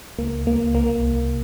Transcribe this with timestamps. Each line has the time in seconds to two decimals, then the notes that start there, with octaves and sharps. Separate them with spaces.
0.18 C#2 A#3
0.46 C#2 A#3
0.74 C2 A#3
1.02 C2